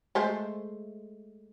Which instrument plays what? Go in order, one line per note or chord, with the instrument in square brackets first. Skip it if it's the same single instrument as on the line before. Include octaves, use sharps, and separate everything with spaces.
[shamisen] G#3 A3 C5